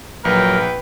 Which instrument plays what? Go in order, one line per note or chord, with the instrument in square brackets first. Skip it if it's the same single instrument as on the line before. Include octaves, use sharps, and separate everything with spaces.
[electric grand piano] A#1 [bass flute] F#3 [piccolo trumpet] A#4 [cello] B4 G5